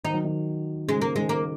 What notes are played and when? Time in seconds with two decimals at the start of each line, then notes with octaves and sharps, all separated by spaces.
0.05 D#3 D#4
0.14 F#3
0.25 D#3
0.88 C#3 G#3
1.02 A#3
1.16 D#3 G#3
1.29 A#3